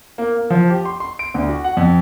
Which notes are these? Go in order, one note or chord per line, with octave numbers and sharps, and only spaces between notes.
A#3
A#3
F3
G4
C6
C6
D7
D2
F#4
F#5
F2